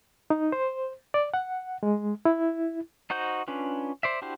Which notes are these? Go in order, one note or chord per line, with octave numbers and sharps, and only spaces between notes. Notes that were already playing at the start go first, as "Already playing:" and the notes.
D#4
C5
D5
F#5
G#3
E4
D#4 F#4 C5 G6
C#4 D4 F4 B4
C5 D5 E5
D4 E4 F#4 G4 C5